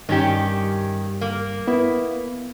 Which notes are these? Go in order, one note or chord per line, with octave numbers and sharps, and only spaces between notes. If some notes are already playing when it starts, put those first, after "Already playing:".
G2 D#3 C#4 G4
A#3
B3 E4